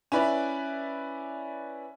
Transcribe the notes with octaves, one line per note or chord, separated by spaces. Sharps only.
C#4 E4 B4 D5